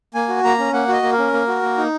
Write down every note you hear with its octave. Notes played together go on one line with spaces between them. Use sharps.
A#3 G#5
F#4
A#3 A#5
C#4
A#3 F#5
F#4 D#5
A#3
A#4
C#4
A#3
F#4
A#3
D#4